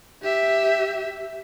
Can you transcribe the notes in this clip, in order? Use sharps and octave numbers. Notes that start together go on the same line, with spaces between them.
G4 E5